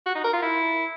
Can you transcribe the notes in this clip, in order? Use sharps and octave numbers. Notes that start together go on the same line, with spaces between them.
F#4
D#4
A#4
F4
E4